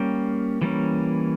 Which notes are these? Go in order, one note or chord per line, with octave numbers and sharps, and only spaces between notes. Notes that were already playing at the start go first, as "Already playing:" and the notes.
Already playing: G3 A#3 C#4 G5
E3 G3 A#3 C#4